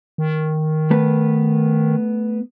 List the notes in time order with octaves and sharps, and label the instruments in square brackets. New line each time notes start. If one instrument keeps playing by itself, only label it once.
[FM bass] D#3
[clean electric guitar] A3 B3 B4